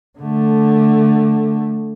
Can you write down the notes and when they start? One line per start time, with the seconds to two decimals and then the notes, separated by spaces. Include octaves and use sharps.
0.19 D3 A3